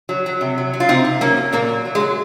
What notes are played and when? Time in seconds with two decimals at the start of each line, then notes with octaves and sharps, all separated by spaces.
0.09 F#3
0.26 F#3
0.41 C3
0.58 F#3
0.73 F#3
0.80 F4
0.88 C3 C4 D#4
1.05 C3
1.21 F#3 A#3 C#4
1.37 F#3
1.52 A#2 A#3
1.69 F#3
1.85 F#3
1.95 G#3
2.00 F#3